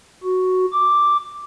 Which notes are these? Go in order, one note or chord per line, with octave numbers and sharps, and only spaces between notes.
F#4
D6